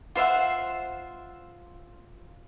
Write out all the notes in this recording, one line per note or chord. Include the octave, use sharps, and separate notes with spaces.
F4 C5 E5 F#5